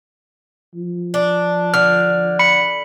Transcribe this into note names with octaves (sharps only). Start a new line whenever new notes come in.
F3
D4
D3 F6
B5 C#7